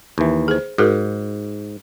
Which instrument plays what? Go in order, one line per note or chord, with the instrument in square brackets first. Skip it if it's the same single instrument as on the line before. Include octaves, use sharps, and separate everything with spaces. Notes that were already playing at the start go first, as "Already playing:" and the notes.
[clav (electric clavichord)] D#2 E3
[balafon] G#4 C5
[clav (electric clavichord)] G#2 [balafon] F#4 G#4 A#4